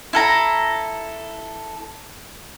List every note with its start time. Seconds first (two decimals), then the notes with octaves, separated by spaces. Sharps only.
0.13 E4 A4 A#5